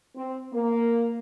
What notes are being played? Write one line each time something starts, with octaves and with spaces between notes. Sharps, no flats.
C4
A#3